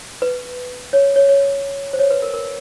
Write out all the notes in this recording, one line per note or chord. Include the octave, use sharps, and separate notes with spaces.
B4
C#5
C#5
C#5
C5
C#5
B4
A#4
A#4